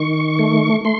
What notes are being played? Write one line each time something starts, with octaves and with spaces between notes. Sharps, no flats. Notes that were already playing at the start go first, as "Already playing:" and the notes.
Already playing: D#3 C#6
A3
A3 C6